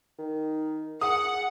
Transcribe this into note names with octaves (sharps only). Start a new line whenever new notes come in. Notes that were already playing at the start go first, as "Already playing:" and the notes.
D#3
G#4 F#5 D#6